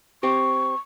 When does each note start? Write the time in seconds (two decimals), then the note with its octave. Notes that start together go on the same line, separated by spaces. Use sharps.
0.23 C4 G4 C#6